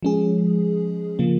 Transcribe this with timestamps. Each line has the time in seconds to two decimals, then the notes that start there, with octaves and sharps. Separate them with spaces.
0.03 F3 G#3 C#4 G#4
1.19 C#3 F3 A#3